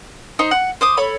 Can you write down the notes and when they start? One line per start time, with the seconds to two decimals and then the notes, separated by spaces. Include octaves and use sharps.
0.39 D#4 C5
0.51 F#5
0.81 C5 D6 D#6
0.97 A4 C#5 B5